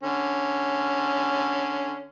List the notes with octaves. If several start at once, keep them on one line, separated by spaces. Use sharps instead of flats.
D3 C#4